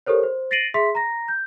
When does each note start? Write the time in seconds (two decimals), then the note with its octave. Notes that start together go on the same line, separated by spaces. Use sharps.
0.06 G4 A4 A#4 C5 C#5
0.23 C5
0.51 A6 A#6 C7 D7 D#7 F#7
0.74 G#4 E5 C6 B6
0.95 A#5 A#6
1.28 G6